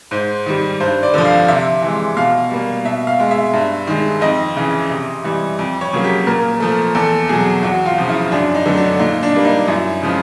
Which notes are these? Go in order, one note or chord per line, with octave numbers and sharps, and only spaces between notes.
G#2 C5
D#3 G3
G2 C5
D5
D3 F3
F5
C3 E5
E3 G#3
B2 F5
G3 A#3
B2 E5
F5
G#3
E5
G2
D#3 G#3
F2 D#5
C#3 E3
C3
E3 G3
F2
C#5
C#3 F#3 A#3
G4
A#2 A#4
F3 A3
E2 A4
B2 F#3 G#4
E2 F#4
F4
C#3 F3
E4
F#2 D4
D#4
D3 F#3 A3
D4
A#2 D#4
D4
G3 A#3
D#4
F#2 E4
C#3 F3 G#3